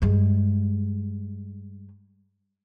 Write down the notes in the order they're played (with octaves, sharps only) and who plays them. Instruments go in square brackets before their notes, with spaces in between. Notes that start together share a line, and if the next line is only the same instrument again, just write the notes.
[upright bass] G2 G#3